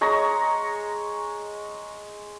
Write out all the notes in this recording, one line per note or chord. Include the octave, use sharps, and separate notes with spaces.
G#3 C#5 A#5 C#6